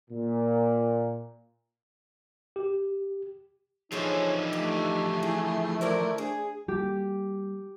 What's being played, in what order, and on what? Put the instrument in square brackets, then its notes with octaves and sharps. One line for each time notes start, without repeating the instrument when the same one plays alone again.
[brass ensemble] A#2
[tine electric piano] G4
[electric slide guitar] D3 E3 F3 [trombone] D#4 [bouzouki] G#4 C5 C#5
[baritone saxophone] A3 [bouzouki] G4
[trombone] E4 [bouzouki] G#4
[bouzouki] E4 A#4 D5 [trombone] C5
[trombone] D4 [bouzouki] G#4
[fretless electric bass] G3 A#3 [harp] G4